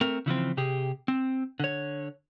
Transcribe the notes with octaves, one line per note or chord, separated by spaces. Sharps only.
A3 C4 A#4
C#3 E3 F3 C4
C3 G4 G#4
C4
D3 C#5